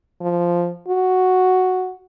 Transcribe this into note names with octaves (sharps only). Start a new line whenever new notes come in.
F3
F#4